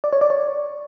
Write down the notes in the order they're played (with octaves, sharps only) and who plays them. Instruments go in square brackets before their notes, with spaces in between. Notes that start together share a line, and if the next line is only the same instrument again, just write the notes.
[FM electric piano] D5
C#5
D5
C#5